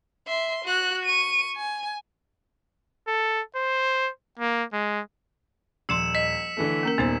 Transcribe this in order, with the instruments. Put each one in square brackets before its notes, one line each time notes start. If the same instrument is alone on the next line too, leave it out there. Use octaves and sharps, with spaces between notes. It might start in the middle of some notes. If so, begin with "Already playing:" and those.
[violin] E5 C6
F#4 F#6
C#6 D#7
G#5
[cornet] A4
C5
A#3
G#3
[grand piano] D#1 [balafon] F3 C6 [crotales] E6 C#7 E7
[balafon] D#5 [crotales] B6
[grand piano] D3 E3 A3
[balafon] A#3 C#4 A#4
[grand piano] D#1 [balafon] B3 D#4 C5